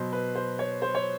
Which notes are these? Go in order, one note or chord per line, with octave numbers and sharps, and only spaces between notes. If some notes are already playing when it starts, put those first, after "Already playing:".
Already playing: B2 F#3 C5
B4
C5
C#5
C5
C#5